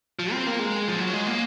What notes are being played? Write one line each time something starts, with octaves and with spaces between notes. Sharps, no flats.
F3
C4
A#3
G#3
F3
F#3
G#3
A#3